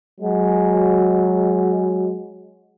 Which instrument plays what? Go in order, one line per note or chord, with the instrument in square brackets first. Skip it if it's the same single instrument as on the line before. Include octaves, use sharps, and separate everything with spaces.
[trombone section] F#3 G#3